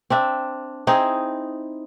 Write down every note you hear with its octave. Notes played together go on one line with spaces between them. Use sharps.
C4 D4 E5
C4 D#4 E4 G#4